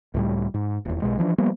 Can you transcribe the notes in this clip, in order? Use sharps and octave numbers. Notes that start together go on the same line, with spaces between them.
C#2 A2 G3
G#2
D#1 E2
B1 E2 B2 G#3
E3 F3 G#3 D4
F3 G3 A#3 B3